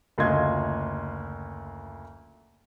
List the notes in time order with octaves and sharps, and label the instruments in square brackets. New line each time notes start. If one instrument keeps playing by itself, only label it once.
[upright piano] F#1 D2 F4 D#5 C6 G#6